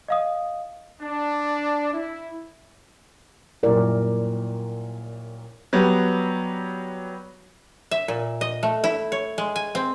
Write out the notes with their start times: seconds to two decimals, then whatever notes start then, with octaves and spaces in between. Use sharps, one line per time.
0.08 D#5 F5 D#6
1.02 D4
1.94 E4
3.63 F#2 A#2 G3 E4 A#4 D5
5.73 F#3 G3 B3
7.91 E5
8.08 A#2
8.41 D#5
8.63 A3
8.84 E4
9.12 C#5
9.38 G#3
9.56 G#5
9.75 C4